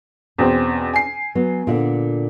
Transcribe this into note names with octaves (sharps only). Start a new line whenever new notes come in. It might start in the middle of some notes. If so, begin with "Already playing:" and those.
E2 B2 C4 C#4
G#5 C7
F#3 B3
A#2 D3 F#5